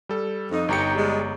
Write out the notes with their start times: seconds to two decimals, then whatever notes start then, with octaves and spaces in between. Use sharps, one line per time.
0.09 G3 A4
0.51 F2 D#4
0.69 G1 D#4 G4 A#5 C#7
0.95 G3 G#3